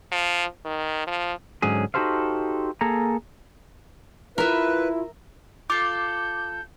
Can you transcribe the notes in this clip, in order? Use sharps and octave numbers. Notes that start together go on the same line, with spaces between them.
F3
D#3
F3
G#2 D3 F#3 C#4 G#4
D#4 F#4 G4 A4 C5 F5
A#3 G#4 A4 A#5
E4 F4 A#4 B4 E5
F4 A4 D6 G6